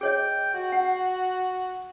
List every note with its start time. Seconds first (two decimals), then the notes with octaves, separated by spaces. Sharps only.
0.01 G#4 C#5 D#5 G5
0.54 F#4
0.72 F#5